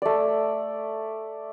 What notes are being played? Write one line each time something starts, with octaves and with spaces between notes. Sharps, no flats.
A3 D5